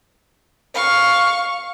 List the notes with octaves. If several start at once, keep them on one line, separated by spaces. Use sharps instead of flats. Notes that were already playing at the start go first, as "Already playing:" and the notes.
F5 C#6